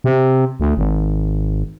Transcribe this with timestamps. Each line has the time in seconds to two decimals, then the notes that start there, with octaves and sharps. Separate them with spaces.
0.04 C3
0.60 D2
0.77 G#1